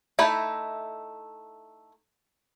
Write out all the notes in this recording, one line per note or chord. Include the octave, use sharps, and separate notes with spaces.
A3 D#4 E4 B5